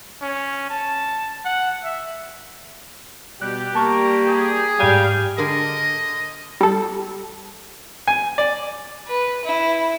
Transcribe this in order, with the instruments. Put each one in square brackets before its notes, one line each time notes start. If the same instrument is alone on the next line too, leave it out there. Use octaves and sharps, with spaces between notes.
[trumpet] C#4
A5
F#5
E5
[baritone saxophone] B2 [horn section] G3 G4 [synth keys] F#6
[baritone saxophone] A#3 [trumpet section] A#4 [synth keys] A5 C#6
[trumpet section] G#4
[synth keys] G#2 G6 D#7 [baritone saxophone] G3 [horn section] F5 G5
[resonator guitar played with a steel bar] D3 G#4 A#4 [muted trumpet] D#5
[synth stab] G3 A4
[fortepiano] G#5
D5
[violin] B4
E4